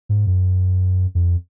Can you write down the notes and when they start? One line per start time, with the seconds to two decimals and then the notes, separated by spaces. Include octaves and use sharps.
0.09 G#2
0.27 F#2
1.15 F2